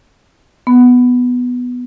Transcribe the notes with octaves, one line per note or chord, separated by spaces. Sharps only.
B3